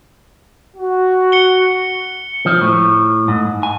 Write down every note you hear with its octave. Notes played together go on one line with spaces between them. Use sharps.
F#4
C#7 G7
F3
A2
G#2
G#5